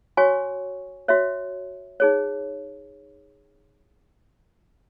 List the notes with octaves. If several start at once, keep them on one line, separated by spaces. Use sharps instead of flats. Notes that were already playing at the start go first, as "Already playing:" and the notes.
F#4 C#5 G#5 C#6
F#4 C#5 E5
D#4 G#4 C#5